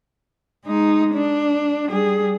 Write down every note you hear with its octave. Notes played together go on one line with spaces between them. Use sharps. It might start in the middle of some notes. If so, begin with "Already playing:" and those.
G#3 D#4
D4
G3 G#4